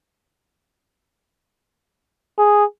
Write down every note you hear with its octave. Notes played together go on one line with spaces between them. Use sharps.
G#4